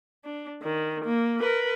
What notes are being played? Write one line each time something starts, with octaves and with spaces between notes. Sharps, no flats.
D4
D#3
A#3
A#4 B4